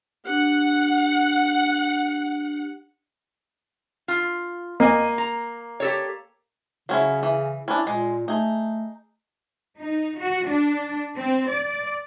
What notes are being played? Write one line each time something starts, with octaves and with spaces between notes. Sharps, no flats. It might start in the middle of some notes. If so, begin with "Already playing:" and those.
D4 G4 F#5
F4
A#3 D#5 G#5
A#5
G4 A4 C#5
C#3 F#3 C#4 E4
E3
C#4 D4 E4
A#2 G#3
A3 D#4 G#4
D#4
F#4
D4
C4
D5